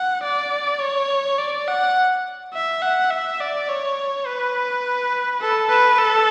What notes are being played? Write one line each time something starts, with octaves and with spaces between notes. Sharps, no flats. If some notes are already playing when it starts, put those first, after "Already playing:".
Already playing: F#5
D5
C#5
D5
F#5
E5
F#5
E5
D5
C#5
B4
A4
B4
A4